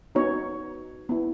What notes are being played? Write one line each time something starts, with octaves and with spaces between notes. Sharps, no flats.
B3 D#4 F#4 C#5
B3 E4